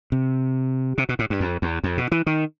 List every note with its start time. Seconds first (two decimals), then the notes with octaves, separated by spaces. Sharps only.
0.12 C3
0.98 C3
1.09 B2
1.19 A2
1.30 G2
1.40 F2
1.62 E2
1.84 F2
1.97 B2
2.12 E3
2.26 D#3